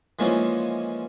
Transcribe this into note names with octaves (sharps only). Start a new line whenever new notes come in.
E3 F3 G#3 A#3 C#4 D#4